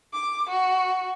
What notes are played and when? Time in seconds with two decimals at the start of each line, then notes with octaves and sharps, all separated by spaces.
0.13 D6
0.49 F#4